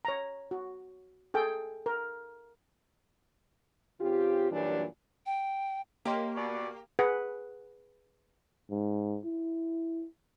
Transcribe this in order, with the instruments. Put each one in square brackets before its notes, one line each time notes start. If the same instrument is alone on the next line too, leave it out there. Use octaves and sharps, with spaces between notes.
[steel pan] C#5 A#5
F#4
G#4 A4 G5
A#4
[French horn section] C#3 C4 F4 G4
F#2 A#2 E3 F#3 G3 D4
[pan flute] G5
[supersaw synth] A#3 [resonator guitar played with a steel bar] G4 [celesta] C#5 D#5 C6
[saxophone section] B2 D5 [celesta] C#6
[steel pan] G#4 B4 F#5
[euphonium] G#2
E4